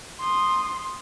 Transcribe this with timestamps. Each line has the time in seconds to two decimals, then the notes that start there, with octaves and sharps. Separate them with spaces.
0.20 C6 D#6